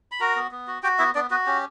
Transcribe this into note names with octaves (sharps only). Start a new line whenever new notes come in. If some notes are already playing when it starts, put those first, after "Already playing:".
B5
F#4 A#4 A#5
B3
B3
F#4
F#4 G4 G5
B3 E4 E5
B3 D4 D5
B3 F#4 B4
C#4 G4